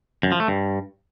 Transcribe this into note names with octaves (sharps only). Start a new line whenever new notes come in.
F#2
F3
A3
G2